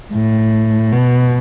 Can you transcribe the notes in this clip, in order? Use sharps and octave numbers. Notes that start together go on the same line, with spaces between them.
A2
B2